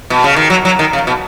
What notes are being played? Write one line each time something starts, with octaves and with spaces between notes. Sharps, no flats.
B2
C#3
D#3
F#3
F#3
D#3
C#3
B2